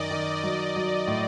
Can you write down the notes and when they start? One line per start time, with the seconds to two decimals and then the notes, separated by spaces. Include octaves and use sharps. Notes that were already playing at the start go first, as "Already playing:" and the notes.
Already playing: F#2 D#3 D5 D#5
0.11 D#3
0.44 F#3
0.76 F#3
1.07 A2